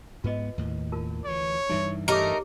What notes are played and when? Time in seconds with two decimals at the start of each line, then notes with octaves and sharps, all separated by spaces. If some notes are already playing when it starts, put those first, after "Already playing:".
0.24 G#2 B3 F4 B4 D#5
0.58 D#2 A2 D#3
0.92 F4 A#4 A5
1.25 D2 E3 C#5
1.69 G2 E3 G3 D#4 E4 E5
2.08 A3 D#4 G4 A#4 C#5 D6